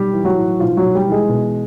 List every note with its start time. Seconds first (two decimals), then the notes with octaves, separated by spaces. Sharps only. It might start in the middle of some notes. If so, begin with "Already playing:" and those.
Already playing: B1 G3 G4
0.13 E3
0.24 F#3 F#4
0.37 A2
0.60 B1 F3 F4
0.77 F#3 F#4
0.82 B1
0.95 G3 G4
1.07 E3
1.12 G#3 G#4
1.29 B2